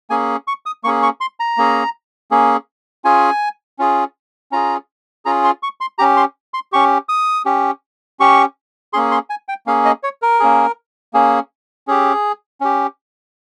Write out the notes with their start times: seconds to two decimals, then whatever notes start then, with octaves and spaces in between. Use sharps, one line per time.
0.10 A#3 C#4 G#4 G#5
0.47 C#6
0.66 D#6
0.84 A#3 C#4 G#4 C#6
1.03 C#6
1.21 C6
1.40 A#5
1.57 A#3 C#4 G#4
2.31 A#3 C#4 G#4
3.05 C#4 F4 G#4 G#5
3.79 C#4 F4 G#4
4.52 C#4 F4 G#4 A#5
5.25 C#4 F4 G#4 A#5
5.44 C6
5.63 C#6
5.81 C6
5.98 C#4 G4 A#5
6.17 C6
6.54 C6
6.72 C#4 G4 C#6
7.09 D#6
7.46 C#4 G4
8.20 C#4 G4 C#6
8.93 A#3 C#4 G#4 C6
9.11 C6
9.30 G#5
9.49 G5
9.66 A#3 C#4 G#4 F5
9.85 D#5
10.03 C#5
10.22 A#4
10.40 A#3 C#4 G#4
11.13 A#3 C#4 G#4
11.88 C#4 G4 G#4
12.61 C#4 G4